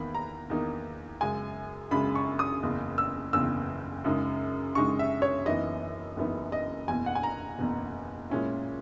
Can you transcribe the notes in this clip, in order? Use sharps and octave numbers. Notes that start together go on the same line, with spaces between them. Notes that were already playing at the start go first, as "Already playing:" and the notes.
Already playing: E2 D#3 A#3 D#4 B5
A#5
E2 D#3 A#3 D#4
F#2 C#3 G#3 G#5
F#2 C#3 G#3 B5
C#6
D#6
F#1 E2 C#3
E6
F#1 E2 C#3 E6
F#2 C#3 G#3 D#4
F#2 C#3 G#3 D#4 C#6
E5
C#5
F#1 F#2 E3 B3 D#4 D#5
F#1 F#2 E3 B3 D#4
D#5
F#1 E2 B2 G#5
F#5
G#5
A#5
F#1 E2 B2
A#2 G#3 C#4 E4